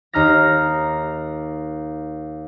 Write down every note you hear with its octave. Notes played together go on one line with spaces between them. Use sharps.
D#2 D#4 A#5 F6 A#6